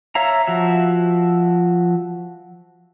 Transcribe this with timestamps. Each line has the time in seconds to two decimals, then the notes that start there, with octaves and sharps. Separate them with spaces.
0.15 C#5 E5 F5 A#5
0.47 F3 F#4 E5